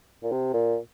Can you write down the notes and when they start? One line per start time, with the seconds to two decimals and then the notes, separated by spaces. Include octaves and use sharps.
0.23 A#2
0.32 C3
0.54 A#2